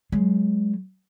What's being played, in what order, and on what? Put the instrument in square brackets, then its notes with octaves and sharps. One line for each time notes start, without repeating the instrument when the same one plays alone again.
[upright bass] F#3 G#3